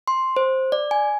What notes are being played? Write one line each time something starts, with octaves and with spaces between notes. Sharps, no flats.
C6
C5
D5
G#5